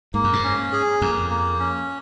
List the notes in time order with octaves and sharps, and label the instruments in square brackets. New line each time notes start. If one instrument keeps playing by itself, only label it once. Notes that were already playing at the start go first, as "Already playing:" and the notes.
[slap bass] G#2 [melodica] A#3
[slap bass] F#2
G#2
[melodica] C#4
G#4
[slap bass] F2 [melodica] A#3
[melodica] A#3
C#4